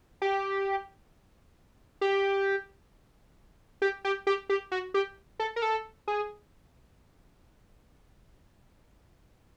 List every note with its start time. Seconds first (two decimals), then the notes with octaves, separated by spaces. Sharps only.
0.22 G4
2.01 G4
3.82 G4
4.05 G4
4.27 G4
4.49 G4
4.72 F#4
4.94 G4
5.40 A4
5.56 A#4
5.62 A4
6.08 G#4